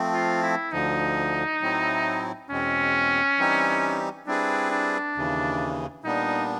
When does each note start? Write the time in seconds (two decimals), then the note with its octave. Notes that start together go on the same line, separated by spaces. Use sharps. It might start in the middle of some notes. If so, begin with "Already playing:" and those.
Already playing: F3 A3 C4
0.13 F4
0.43 E4
0.72 D2 D3 F3 D#4
1.61 A2 F#3 A3 C4 E4
2.50 E2 B2 G#3 C4 C#4
3.38 E3 G3 C4 D#4 G4
4.27 G3 C4 D4 E4 G#4 B4
4.72 D4
5.16 D#2 C#3 E3
6.04 A#2 G3 B3 D4 D#4